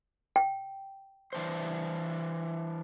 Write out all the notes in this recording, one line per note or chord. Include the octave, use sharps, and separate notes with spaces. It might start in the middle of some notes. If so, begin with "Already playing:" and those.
G5
E3 D4 C5